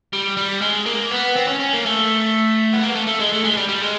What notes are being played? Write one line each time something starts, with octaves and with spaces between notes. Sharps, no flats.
G3
G3
G#3
A#3
B3
C4
C#4
C#4
A#3
A3
B3
A#3
A3
A3
G#3
A3
G#3
G3
G3
G#3